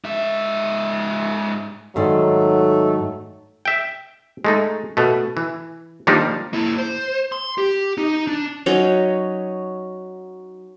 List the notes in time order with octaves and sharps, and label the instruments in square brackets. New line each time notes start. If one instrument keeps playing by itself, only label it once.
[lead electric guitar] G#2 E5
[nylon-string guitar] G#2 D#3 D5 [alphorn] F#3 [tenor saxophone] A3
[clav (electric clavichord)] E5 G5
G#3 A3 D#4
B2 A3
E3
D#3 F3 G3 A#3 D4 D#4
[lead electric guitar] A#3 E4
C5
C6
G4
D#4
D4
[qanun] F#3 C#4 D#4 C#5